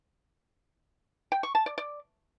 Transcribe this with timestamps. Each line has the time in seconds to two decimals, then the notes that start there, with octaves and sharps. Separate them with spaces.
1.32 G5
1.43 C#6
1.55 A5
1.66 D5
1.78 D5